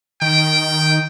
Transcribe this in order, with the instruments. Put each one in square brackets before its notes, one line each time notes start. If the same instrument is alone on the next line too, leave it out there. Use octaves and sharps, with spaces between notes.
[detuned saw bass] D#3 [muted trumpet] G5